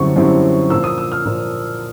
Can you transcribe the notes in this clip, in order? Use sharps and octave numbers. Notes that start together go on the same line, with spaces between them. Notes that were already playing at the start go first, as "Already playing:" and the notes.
Already playing: F#2 D3 G3 C4 E4 C#6
F#2 D3 G3 C4 E4
A#2 F3 A#3 E6
D#6
E6
F6
A#2 F3 A#3